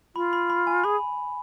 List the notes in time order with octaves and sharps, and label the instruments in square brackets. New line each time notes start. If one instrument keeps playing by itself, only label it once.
[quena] F4 [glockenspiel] B5
[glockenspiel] B5
B5
G#5
[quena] G#4 [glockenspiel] B5